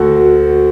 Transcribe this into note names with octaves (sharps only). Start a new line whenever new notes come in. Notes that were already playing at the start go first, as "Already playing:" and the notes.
Already playing: D2 F#4 A4